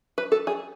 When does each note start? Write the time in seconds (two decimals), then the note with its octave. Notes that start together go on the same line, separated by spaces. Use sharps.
0.18 B4
0.32 A4
0.47 G#4